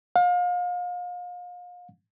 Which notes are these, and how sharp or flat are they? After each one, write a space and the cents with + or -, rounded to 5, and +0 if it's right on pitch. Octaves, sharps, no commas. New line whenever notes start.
F5 +35